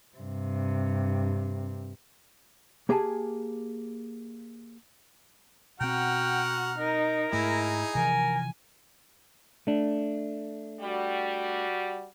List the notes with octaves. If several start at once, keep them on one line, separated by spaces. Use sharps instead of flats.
G2 C3
A#3 G4 G#4 G#5 A5
B2 C4 F#4 F#5 G5 A#5 F6
D#4 A#4
G#2 A3 D#4 E4 G#4
C3 E3 F3 A#4 G#5
A3 D4
G3 F#4